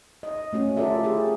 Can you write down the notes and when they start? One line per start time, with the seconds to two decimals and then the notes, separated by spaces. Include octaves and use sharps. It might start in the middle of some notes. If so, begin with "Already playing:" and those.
0.23 D#5
0.53 A3 C#4 F#4
0.77 F4 G4 A4 A#4 D5 E5
1.03 E4 G4 G#4 A#4